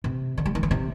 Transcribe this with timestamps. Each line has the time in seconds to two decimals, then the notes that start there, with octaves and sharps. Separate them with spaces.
0.04 C3
0.37 D3
0.46 G3
0.55 E3
0.63 D3
0.71 C3